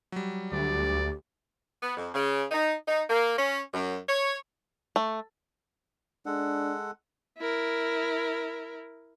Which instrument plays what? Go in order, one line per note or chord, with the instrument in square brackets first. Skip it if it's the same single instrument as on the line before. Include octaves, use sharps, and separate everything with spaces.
[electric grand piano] F#3 G3
[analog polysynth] D2 [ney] G4 [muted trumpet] D5
[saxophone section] B3
F2
C#3
D#4
D#4
A#3
C#4
F#2
C#5
[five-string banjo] A3
[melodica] G#3 A4 F#5 [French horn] D4
[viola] E4 A#4